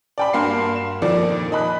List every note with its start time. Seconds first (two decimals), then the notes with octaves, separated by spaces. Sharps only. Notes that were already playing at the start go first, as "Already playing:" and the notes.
0.18 D5 G5 B5
0.33 G2 A#3 F#4 F5 C6 C7
0.75 E7
1.02 F2 A#2 D#3 D5
1.52 D#5 B5 F#6